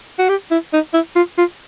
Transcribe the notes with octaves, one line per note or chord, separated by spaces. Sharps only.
F#4
G4
E4
D#4
E4
F4
F4